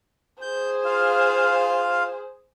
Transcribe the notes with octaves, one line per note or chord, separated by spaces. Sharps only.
G#4 C5 G6
F4 F5